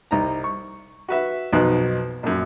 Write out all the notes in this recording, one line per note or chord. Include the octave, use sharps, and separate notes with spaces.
C2 D#4 A#5
C#6
F#4 B4 E5
B1 F2 B2 D#4 F#6
A#1 F#2